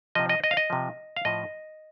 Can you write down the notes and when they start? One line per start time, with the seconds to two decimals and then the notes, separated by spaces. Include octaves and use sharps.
0.15 C3 F3 D#5
0.29 D#5
0.44 D#5
0.51 F5
0.57 D#5
0.70 C3 F3
1.16 F5
1.25 A2 F3 D#5